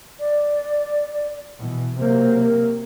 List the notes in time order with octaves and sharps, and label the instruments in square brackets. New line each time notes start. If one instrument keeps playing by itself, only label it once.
[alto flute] D5
[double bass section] B2 E3
[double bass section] C3 F#3 A#3 [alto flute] C5
[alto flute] A#4